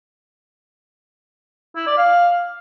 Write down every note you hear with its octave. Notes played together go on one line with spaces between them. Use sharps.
E4
D5
F5